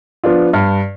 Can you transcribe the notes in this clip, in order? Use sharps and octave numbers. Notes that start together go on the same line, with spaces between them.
F3 B3 D4 F4
G2